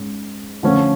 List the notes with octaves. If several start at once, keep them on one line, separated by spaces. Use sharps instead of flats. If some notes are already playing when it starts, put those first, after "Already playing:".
Already playing: G#2 G#3 C#4
D3 F3 A3 C#4